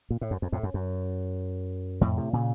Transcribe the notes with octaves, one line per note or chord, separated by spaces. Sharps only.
A#2
A2
F#2
F2
F2 A2
F#2
F#2
F2 A2
A2 C3
A#2 C#3